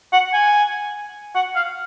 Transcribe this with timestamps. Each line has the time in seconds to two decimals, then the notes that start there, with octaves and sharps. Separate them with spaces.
0.13 F#5
0.34 G#5
1.35 F#5
1.56 F5